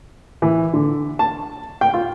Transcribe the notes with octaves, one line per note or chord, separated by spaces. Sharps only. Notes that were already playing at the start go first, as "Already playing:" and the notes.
E3
D3
A5
G5
F4